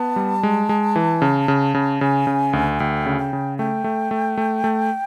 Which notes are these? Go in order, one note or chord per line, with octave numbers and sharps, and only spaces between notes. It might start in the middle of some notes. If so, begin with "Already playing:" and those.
Already playing: B3 A5
G3
G#3
G#3
E3
C#3
C#3
C#3
C#3 G#5
C#3
D2
D2 G5
C#3
G5
C#3
A3 G5
A3
A3
A3
A3